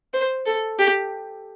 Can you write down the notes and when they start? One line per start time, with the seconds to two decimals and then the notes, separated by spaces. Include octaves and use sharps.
0.14 C5
0.46 A4
0.79 G4